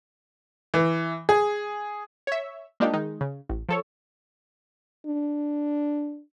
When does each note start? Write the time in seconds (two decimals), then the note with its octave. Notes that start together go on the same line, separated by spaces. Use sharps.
0.74 E3
1.29 G#4
2.27 C#5 E5
2.80 G#3 A#3 D4 D#4 F4 G4
2.93 D#3 G#3 D#4
3.21 C#3
3.49 A1
3.69 F3 A4 C#5
5.06 D4